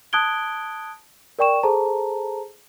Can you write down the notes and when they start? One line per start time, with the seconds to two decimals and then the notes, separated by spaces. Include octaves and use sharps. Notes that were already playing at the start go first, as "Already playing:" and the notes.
0.13 A5 D#6 F#6 G#6 D7 G7
1.39 A#4 D5 G5 C#6 E7
1.63 G#4 A4 C5 A5 A#5